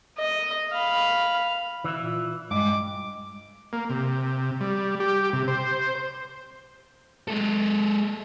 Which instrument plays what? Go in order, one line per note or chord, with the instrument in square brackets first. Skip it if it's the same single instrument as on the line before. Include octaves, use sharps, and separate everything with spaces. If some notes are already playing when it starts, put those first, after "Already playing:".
[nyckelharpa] D#5
F5 B5
[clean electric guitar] E3 E4
[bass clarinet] A#2
[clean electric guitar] G2 [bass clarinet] G#3 [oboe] D6
[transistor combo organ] A#3
C3
G3
G4
C3
C5
[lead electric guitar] G#3 A4